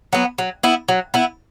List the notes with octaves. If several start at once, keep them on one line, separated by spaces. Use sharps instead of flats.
F#3 B3
F#3
B3 E4
F#3
B3 E4